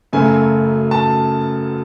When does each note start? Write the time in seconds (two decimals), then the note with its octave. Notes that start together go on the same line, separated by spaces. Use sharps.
0.13 F#2 C#3 F#3 A3 G#5
0.91 A5